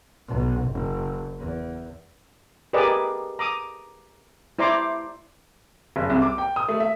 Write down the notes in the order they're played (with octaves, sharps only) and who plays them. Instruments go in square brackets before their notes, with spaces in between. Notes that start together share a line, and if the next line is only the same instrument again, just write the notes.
[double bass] B1
F#1
E2
[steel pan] G4 G#4 A#4 B4 D5 D#5
A#5 D6 D#6
E4 C5 D5 A#5 C6 D6
[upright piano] F#1
C2
D6
G5
D#6
A3
E5